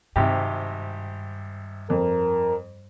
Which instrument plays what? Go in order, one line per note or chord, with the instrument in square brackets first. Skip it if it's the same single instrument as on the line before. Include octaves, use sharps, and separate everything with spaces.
[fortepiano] G#1 C3 G4 [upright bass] G2
[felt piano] F2 [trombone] A#4